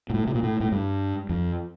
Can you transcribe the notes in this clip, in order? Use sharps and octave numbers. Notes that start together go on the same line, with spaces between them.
A#2
A2
C3
A#2
A2
A2
G2
F2